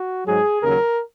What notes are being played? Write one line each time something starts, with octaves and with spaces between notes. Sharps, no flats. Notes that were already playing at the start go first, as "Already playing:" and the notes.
Already playing: F#4
G#2 F#3 G#4
D#2 C#3 F#3 A#4